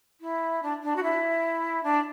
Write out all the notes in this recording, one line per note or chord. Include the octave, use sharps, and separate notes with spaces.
E4
D4
D4
F#4
E4
D4